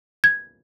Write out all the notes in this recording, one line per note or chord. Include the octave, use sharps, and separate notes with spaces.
G#6